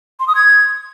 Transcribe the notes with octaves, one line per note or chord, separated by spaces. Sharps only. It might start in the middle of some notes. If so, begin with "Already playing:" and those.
C6
D#6
G#6